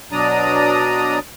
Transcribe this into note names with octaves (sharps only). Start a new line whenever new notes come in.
B2 F#3 D4 D5 A#5 D#6